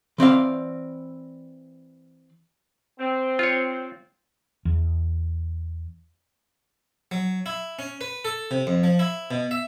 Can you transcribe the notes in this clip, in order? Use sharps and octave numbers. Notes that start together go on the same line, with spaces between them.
E3 C4 D5 F5
C4
F4 C#5
E2
F#3
E4
C#4
B4
A4
C3
F2
F3
E4
B2
E5